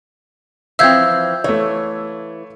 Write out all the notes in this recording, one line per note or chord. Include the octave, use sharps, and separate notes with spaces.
E3 F3 C4 E5 F5 E6 G6 G#6
E3 A3 C#5